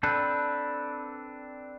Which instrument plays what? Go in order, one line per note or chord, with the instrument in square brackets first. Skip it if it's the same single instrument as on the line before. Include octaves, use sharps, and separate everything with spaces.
[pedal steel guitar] C4 D4 A4 B4